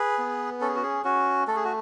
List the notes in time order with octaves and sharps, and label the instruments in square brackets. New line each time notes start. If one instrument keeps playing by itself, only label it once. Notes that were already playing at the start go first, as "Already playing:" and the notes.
Already playing: [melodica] G#4 B4
B3
C#4 A4
G#4
F#4
G#4
C#4 F#4
A3 A4
G#4
F#4